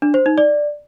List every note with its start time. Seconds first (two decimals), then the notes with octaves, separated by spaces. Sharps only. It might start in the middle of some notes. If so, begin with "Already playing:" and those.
0.02 D4
0.14 C5
0.26 D#4
0.38 D5